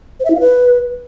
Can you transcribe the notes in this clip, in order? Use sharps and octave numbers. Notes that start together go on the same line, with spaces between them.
C5
E5
E4
F5
B4